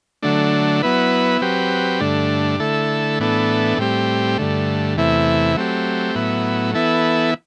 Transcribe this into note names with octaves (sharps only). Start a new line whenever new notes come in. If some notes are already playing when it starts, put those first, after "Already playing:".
D3 F#3 A3 D4
F#3 B3 E4 B4
F#3 C4 G4 B4
G2 D3 A3 D4
D3 A3 E4 A4
A2 E3 B3 D4 A4
A2 G3 C4 G4
G2 D3 A3
E2 C3 E3 A3 E4
F#3 A3 C4 G4
A2 F#3 B3 E4
E3 B3 E4 A4